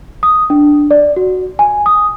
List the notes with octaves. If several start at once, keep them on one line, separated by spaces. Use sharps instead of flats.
D#6
D4
D5
F#4
G#5
D#6